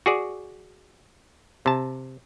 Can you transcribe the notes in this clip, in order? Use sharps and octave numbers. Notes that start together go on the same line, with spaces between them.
F#4 G#4 D5
C3 A5